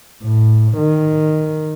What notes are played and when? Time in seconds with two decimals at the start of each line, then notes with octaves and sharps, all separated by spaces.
0.23 A2
0.77 D#3